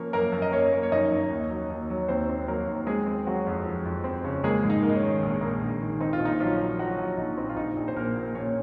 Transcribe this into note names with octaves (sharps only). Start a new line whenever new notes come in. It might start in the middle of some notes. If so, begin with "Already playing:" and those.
Already playing: F3 A#3 C#4 C#5
F#2 A#3 A#4
F#2
D#5
A#3 C#4 C#5
A#3
C#5
F#2 D#4 D#5
F#2
D#2
F#3
D#2
F#3
D#2 C4 C5
C4
F#3 A#3 A#4
D#2
G#3 C4 G#4
C4
F#3 C4 F#4
F2
F3
F2
C4
C#3
G#3 A#3 G#4
G#2
D#4
A#3
D#4
C#4
D#3
A#1
A#3
A#1
D#3
C4 D#4
F4
A#1
D#4
F3 F#3 F4
F#3
F#3 F#4
F#3
A#1 D#4
C4
F4
A#1 D#4
A#1
C5
A#1 A#3 A#4
A#2
A#2 C#4 C#5